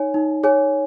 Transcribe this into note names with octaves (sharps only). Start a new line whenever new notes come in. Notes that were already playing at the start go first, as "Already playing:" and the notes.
Already playing: D#4 C#5 G#5
D#4
G#4 C#5 G#5